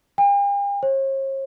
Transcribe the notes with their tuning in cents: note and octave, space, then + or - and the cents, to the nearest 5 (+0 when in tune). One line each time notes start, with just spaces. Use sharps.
G5 +45
C#5 -45